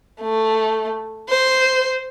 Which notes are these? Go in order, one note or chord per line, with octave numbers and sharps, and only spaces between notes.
A3
C5